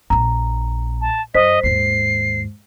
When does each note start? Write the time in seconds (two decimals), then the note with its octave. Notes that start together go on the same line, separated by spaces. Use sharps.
0.10 A#1 A#2 A#5
1.01 A5
1.35 F#2 C5 D#5 B6
1.63 D#2 G#2 C7